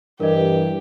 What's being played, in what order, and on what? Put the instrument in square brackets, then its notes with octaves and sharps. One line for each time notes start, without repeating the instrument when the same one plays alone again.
[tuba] G2 [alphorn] E3 [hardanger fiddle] G4 [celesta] A#4 D#5